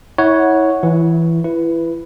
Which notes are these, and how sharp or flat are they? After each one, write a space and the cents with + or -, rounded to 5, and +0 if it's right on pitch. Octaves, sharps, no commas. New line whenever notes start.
E4 -30 C#5 +0 F#5 +0
E3 +5 E4 +20
E4 +25 B4 +0